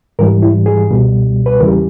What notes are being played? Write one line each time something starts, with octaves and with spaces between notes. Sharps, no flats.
G#2 E3 G3 A#4
E4
G#4
C#2 B2 G3
B4
E2 C#3 E3 G3 A#4